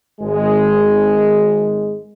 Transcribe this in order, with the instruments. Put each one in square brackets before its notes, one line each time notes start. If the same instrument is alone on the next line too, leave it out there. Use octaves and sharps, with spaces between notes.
[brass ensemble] G#1 G#3